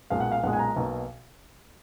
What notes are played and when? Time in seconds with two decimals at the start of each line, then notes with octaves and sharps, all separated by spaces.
0.10 B1 A#2 G#3 F5
0.20 F#5
0.32 F5
0.43 B1 A#2 G#3 F#5
0.53 G#5
0.59 A#5
0.76 B1 B2 A#3